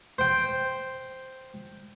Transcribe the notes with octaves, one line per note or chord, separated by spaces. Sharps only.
C5 G5